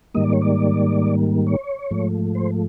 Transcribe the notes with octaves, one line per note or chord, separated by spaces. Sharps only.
G#2 D#3 G3 A#3 D#5
D5
C#5
D5
C#5
G#2 F3 A3
C5